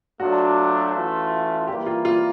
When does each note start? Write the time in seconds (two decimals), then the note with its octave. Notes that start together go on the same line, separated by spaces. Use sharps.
0.19 F#3 A3 D4 F4 F#4
0.94 E3 A3 C#4 F4
1.68 E3 G3 A#3 G4
1.86 F4
2.05 F4